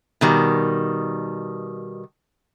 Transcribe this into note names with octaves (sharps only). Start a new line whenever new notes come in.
B2 D#3 G3